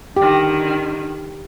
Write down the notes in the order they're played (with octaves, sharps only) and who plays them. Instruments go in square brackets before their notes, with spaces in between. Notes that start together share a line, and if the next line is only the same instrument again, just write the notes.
[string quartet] D3 D#3 [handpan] G4